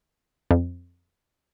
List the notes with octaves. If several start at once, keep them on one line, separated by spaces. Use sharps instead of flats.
F2